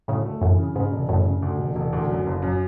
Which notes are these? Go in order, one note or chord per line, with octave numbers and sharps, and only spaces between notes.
D2 A2 C#3
A3
F#2 A2 E3
C#3
G#2 C#3
E1
F#2 A2 C#3
C#3
D2
E1
E1
D2
F#2
F#1
F#2